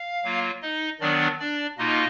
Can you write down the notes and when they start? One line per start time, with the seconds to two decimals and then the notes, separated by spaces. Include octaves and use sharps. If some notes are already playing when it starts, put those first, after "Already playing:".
Already playing: F5
0.24 F#3 A#3 F4
0.62 D#4 D#5
1.00 D#3 F#3 B3 D4 D5
1.40 D4 D5
1.78 B2 A#3 D#4 F4 D#5